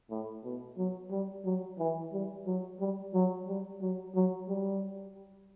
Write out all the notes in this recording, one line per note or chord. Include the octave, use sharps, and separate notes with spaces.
A2
B2
F#3
G3
F#3
E3
G3
F#3
G3
F#3
G3
F#3
F#3
G3